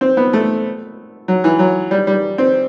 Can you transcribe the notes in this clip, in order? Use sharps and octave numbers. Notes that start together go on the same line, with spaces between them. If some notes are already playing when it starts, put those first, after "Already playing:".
C4
B3
A3
F#3
E3
F#3
G3
G3
C4